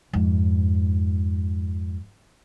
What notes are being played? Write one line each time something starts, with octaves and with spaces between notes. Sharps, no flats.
F2 G#2